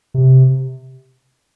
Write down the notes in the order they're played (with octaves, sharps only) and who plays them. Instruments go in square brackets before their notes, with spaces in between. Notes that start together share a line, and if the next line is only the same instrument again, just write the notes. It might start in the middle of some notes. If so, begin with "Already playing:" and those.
[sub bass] C3